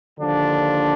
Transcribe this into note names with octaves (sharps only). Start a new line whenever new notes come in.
D#2 D3 F3 D4